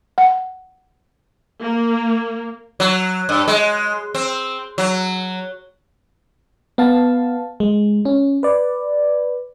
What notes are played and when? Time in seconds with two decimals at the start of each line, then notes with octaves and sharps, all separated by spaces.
0.18 F#5
1.62 A#3
2.80 F#3
3.29 G2
3.48 G#3
4.15 C4
4.78 F#3
6.78 B3 F5 A5
7.60 G#3
8.05 C#4
8.43 B4 D5